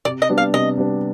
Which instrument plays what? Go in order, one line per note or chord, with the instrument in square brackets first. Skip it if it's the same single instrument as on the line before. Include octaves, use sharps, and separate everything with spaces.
[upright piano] C3 [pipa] D5
[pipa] D#5
[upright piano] G3 B3 D4
[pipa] F5
[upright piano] C3 [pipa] D#5
[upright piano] G3 B3 D4